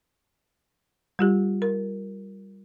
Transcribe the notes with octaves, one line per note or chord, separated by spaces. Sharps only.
G3 F4 G4
A#4